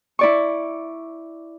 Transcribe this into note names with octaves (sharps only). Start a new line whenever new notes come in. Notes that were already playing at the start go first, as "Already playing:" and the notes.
E4 D5 C#6